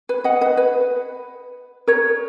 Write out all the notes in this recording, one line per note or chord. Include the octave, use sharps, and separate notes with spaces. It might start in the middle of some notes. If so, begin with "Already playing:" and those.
B4
D#5 F#5
B4 D#5
B4
A#4 C#5